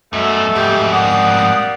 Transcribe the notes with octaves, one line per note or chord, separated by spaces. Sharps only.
F#2 B2 A3
F2 G#2 G4
G3 A#3 D5 F#5 D#6